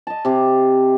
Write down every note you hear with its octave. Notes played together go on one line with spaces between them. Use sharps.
D#5 A5
C3 G4